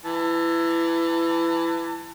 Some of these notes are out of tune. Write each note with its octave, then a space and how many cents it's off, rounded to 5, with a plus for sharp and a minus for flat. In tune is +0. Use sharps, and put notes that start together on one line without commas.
E3 +20 A5 +35